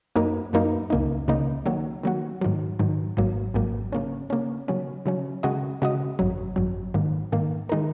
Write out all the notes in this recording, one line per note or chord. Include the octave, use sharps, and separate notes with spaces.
F#2 F#3 A#3 D#4 A#4
F#2 F#3 A#3 D#4 A#4
C#2 C#3 A#3 D#4
C#2 C#3 A#3 D#4
D#3 F#3 A#3 F#4
D#3 F#3 A#3 F#4
G#2 D#3 F#3
G#2 D#3 F#3
G#1 G#2 F#3 A#3
G#1 G#2 F#3 A#3
C#3 A#3 C#4
C#3 A#3 C#4
C#3 F#3 C#4
C#3 F#3 C#4
C#3 G#3 F#4 D#5
C#3 G#3 F#4 D#5
G#1 F#2 F#3
G#1 F#2 F#3
G#2 D#3 A#3
G#2 D#3 A#3
D#3 G#3 D#4 A#4